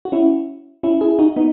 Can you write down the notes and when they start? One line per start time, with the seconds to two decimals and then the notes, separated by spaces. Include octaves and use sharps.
0.05 F#4
0.12 C#4 E4
0.83 C#4 E4
1.01 E4 G#4
1.19 D#4 F#4
1.36 B3 D#4